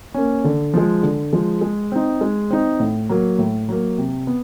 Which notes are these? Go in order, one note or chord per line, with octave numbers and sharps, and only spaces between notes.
A#3 C#4
D3
F3 G#3
D3
F3 G#3
G#3
C4 D#4
G#3
C4 D#4
A2
F#3 A#3
A2
F#3 A#3
C3
B3